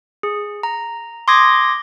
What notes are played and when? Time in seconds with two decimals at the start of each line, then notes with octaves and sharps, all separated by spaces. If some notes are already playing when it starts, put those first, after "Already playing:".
0.23 G#4
0.63 A#5
1.28 C6 D6 D#6 G#6 A#6